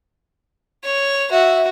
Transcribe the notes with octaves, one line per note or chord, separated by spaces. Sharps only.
C#5
F#4 E5